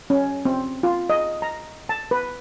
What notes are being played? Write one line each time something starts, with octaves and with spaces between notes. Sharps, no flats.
C#4
C4
F4
D#5
A#5
A5
B4